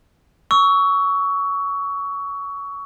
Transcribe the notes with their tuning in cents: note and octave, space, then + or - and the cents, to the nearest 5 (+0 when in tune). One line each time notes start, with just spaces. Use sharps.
C#6 +20 E6 -15